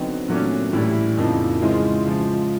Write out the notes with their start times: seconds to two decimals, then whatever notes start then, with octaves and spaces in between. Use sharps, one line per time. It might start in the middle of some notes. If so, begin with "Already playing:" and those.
Already playing: D3 F#3 B3 C4 D#4
0.28 A#2 F#3 A3 C#4 D4
0.73 A2 E3 G3 E4
1.17 F2 C#3 F3 A#3 D#4
1.61 C#3 E3 G#3 C4 E4 F4
2.06 C#3 F3 G#3